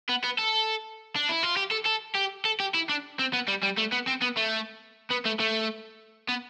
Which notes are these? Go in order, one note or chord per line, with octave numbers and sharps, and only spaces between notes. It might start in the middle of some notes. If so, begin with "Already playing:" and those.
B3
B3
A4
D4
E4
F4
G4
A4
A4
G4
A4
G4
E4
D4
C4
B3
G3
G3
A3
B3
C4
B3
A3
B3
A3
A3
B3